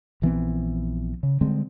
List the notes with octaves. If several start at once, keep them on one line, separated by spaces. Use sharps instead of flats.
A#1 E3 B3 C4
C#3
D3 G3 G#3 C4